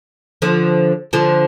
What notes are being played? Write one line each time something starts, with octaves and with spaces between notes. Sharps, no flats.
D3 F3
D3 F3